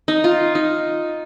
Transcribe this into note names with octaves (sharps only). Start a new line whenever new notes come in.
D#4
F4
D#4